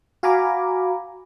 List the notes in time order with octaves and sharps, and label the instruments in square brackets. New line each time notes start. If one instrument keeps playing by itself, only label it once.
[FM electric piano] F#4 F5 G#5 A#5 B5 D6